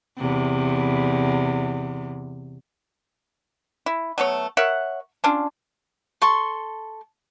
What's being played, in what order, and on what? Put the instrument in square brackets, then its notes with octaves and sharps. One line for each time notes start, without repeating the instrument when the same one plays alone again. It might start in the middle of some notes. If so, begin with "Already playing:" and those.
[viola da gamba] E2 C3
[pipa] E4
F#3 A3 B3 C#5
A#4 C#5 E5 F#5
C#4 D4 F4
[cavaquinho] A4 C6 C#6